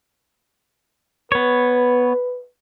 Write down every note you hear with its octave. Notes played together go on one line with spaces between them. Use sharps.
B3 B4 C#5